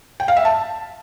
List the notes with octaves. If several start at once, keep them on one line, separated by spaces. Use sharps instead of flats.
G5
F5
E5
A5